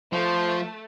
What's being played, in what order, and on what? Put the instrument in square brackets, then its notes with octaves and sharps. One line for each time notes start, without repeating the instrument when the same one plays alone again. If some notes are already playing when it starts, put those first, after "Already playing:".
[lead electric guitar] F3 [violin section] A3 [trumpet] C5